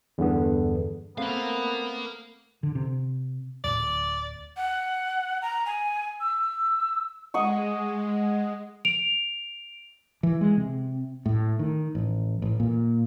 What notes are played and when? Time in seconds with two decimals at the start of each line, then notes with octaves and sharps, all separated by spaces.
0.18 E2 G2 D3 B3
1.18 A3 B3 C4 A#4 F5
2.63 D3
2.75 C3
3.64 D1 D5
4.57 F#5
5.42 A#5
5.66 G#5
6.21 E6
7.34 G#3 D#5 F#5 C#6
8.85 D7 F7
10.23 E3
10.41 G#3
10.57 C3
11.26 A2
11.59 D#3
11.95 A1
12.42 A1
12.60 A#2